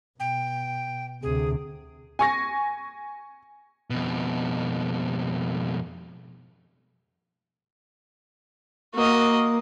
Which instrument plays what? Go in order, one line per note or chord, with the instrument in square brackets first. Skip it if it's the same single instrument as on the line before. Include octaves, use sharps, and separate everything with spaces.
[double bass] B2 [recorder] G5
[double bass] D2 C3 [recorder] G#4
[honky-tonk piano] G#5 C#6 A#6
[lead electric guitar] F2 B2
[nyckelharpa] A#3 [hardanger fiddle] F#4 D#5